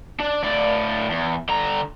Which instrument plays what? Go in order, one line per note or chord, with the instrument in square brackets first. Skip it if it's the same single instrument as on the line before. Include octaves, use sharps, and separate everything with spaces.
[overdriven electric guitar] D4
A2 D5
E2
D3 A#5